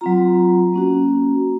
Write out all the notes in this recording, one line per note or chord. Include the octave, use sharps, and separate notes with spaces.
F#3 C4 F4 A#5
A#3 C#4 F#4